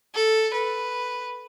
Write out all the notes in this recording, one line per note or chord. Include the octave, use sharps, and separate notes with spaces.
A4
B4